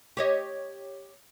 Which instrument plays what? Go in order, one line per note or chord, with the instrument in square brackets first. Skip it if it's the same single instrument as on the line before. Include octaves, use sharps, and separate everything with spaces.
[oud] G4 C#5 D#5